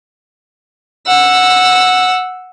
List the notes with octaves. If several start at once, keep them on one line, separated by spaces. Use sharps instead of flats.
F#5 E6